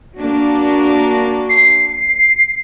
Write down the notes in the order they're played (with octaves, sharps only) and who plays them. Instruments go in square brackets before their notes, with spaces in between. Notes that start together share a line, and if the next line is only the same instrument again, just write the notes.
[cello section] A#3 D4 F#4
[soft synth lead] C7